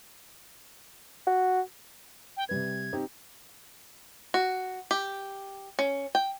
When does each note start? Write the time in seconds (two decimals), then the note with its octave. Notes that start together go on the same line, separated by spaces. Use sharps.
1.27 F#4
2.37 G5
2.49 C3 G3 B4 G#6
2.93 C4 D#4 G4
4.34 F#4
4.91 G4
5.79 C#4
6.15 G5